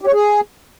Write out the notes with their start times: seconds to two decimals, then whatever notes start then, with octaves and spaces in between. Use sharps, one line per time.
0.01 G4
0.07 C#5
0.13 G#4